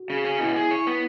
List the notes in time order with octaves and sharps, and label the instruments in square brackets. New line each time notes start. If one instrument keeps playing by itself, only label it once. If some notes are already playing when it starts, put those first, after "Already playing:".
Already playing: [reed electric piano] F#4
[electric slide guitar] C#3
C#4
[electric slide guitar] B2 [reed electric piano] E4
[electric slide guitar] G#4
C#5
B3